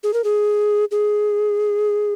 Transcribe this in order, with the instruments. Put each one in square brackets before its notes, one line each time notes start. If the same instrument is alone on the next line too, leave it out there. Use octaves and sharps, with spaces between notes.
[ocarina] G#4
A#4
G#4
G#4